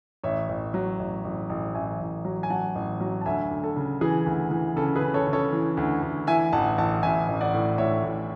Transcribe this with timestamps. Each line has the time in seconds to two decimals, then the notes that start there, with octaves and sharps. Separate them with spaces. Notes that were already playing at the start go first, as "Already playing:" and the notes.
0.24 A1 C#5 E5
0.49 A1
0.74 F#3
0.99 A1
1.24 A1
1.50 A1
1.75 A1 E5 G#5
2.00 A1
2.25 F#3
2.43 G#5
2.50 F#3 F#5 A5
2.75 A1
3.01 F#3
3.21 A5
3.26 D2 E5 G#5
3.51 D2
3.64 A4
3.76 C#3
4.01 E3 G#4
4.26 D2
4.51 E3
4.76 C#3 A4
4.96 G#4 B4
5.01 C#3
5.14 A4 C#5
5.27 C#3
5.33 A4 C#5
5.52 E3
5.77 D2
6.02 D2
6.27 E3 E5 G#5
6.52 A1 F#5 A5
6.78 A1 F#5 A5
7.03 A1 E5 G#5
7.28 A1
7.41 D5 F#5
7.53 A2
7.78 A2 C#5 E5
8.04 A2